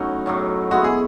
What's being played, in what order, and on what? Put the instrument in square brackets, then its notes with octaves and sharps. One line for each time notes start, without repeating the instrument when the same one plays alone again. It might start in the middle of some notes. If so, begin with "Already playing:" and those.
Already playing: [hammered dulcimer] A2 F#3 C#4 [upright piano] D#4 F#4
[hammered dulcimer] A2 F#3 C#4
[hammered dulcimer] G#3 B3 E4 [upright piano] F#4
[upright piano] G#4